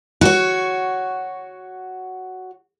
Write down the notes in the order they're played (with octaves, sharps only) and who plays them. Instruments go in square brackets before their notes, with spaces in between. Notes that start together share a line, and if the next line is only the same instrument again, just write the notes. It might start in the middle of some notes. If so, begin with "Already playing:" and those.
[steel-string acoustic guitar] F#4 C#5